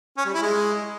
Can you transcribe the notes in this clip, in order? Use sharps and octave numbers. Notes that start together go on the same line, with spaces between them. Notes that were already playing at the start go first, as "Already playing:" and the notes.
C#4
G3
E4
G#3